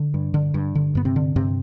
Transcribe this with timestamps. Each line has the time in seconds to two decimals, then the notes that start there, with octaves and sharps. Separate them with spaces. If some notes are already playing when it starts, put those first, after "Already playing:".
Already playing: D3
0.14 G2
0.34 D3
0.54 G2
0.75 D3
0.95 G2 B3
1.05 C3 C4
1.16 D3
1.36 G2 C3 C4